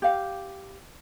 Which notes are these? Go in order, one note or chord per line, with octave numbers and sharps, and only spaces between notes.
G4 F5